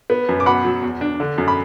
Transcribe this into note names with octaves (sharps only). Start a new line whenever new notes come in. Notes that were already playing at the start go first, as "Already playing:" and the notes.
B3
F#2
D6
B2 F#5 B5
F#3
E2
D4
D3
F#2
B5